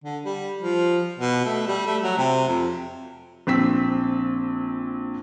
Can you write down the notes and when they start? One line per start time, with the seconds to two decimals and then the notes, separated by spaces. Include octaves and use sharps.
0.04 D3
0.25 G3
0.60 F3
1.19 B2
1.45 A3
1.67 G3
1.86 A3
2.03 F#3
2.18 C3
2.48 F2
3.47 A#1 C4 E6 B6